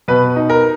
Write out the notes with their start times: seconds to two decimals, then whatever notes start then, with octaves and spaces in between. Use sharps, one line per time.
0.08 B2 B4
0.36 D#4
0.50 A#4